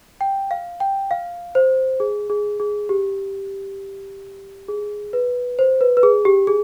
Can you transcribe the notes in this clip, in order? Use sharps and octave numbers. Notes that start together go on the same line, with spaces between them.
G5
F5
G5
F5
C5
G#4
G#4
G#4
G4
G#4
B4
C5
B4
B4
G#4
G4
G#4